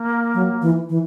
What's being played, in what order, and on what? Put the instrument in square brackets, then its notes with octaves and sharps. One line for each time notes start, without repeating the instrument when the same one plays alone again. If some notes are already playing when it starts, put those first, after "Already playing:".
Already playing: [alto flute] A#3
[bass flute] F#3
E3
E3